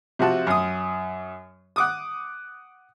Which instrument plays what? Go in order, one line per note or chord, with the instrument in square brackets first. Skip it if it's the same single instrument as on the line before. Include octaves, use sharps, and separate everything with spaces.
[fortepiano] C3 F3 F#4 A5
F#2 D#6
F#5 D6 D#6